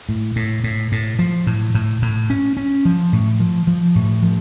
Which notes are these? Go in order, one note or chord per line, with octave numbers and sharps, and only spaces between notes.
A2
A2
A2
A2
F3
A2
A2
A2
C#4
C#4
F3
A2
F3
F3
A2
F3